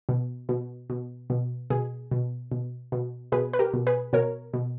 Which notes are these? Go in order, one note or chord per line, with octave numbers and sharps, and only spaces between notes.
B2
B2
B2
B2
B2 G#4
B2
B2
B2
B2 G#4 B4
B4
G4 A#4
B2
G#4 B4
B2 A#4 C#5
B2